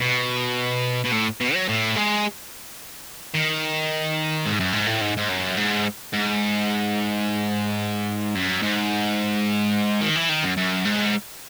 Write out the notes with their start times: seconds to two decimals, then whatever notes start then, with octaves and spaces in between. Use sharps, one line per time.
0.01 B2
1.05 B2
1.12 A2
1.41 B2
1.54 F#3
1.68 A2
1.96 G#3
3.34 D#3
4.46 G#2
4.60 F#2
4.73 G#2
4.87 A2
5.01 G#2
5.17 G#2
5.29 F#2
5.57 G#2
6.13 G#2
8.35 F#2
8.62 G#2
10.01 D#3
10.16 E3
10.29 D#3
10.43 F#2
10.57 F#2
10.85 G#2